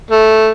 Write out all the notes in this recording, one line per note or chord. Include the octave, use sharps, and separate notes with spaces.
A3